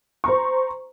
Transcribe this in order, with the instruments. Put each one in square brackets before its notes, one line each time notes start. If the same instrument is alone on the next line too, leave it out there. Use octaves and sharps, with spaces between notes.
[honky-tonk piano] C5 A#5 C#6